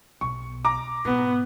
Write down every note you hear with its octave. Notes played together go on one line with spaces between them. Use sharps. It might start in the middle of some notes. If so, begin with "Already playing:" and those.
B1 B2 C#6
A#5 D6
G#2 B2 B3